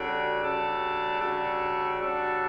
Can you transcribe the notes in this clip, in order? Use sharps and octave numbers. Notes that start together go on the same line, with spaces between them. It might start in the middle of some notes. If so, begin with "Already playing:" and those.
Already playing: C#3 G3 D4 F#4 A4
C#3 G3 D4 F#4 A4
C#3 G3 D4 F#4 A4
C#3 G3 D4 F#4 A4